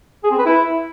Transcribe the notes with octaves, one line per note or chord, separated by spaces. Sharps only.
G#4
C4
B4
E4